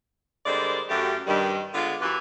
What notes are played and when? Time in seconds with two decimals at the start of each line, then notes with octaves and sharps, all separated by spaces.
0.46 D3 G3 G#3 A#4 C5 D5
0.89 F#2 A3 G4
1.27 G2 D#3 G3
1.74 D3 G#3 B3 F4
2.01 F#2 E3 G4 B4